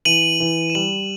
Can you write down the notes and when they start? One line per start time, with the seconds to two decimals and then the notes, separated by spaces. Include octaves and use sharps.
0.05 E3 D#7 F#7
0.40 E3
0.70 E7
0.75 G3 D#7 F#7